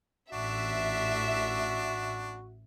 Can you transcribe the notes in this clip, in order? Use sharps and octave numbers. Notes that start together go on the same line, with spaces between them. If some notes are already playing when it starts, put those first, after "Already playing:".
A1 D4 F#4 E5